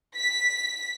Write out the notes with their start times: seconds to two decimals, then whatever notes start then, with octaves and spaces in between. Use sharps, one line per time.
0.16 B6